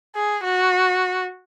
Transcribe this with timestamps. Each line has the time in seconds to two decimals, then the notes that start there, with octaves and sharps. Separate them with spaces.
0.15 G#4
0.44 F#4